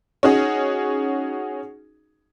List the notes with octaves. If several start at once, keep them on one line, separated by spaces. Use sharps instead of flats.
C#4 D#4 F#4 G#4